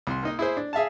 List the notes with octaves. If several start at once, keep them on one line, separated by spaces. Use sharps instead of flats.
C2 C6
A#3 D#4 D#5
E4 G#4 C5
D4
G#4 E5 F5 A5